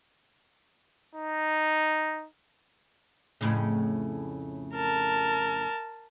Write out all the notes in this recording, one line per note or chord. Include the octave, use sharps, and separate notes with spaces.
D#4
F2 A2 C#3
A#4 A5